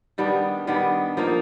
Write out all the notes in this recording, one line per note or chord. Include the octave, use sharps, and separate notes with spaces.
D#3 G3 B3 D4
D#3 G3 B3 D4
F3 A#3 D#4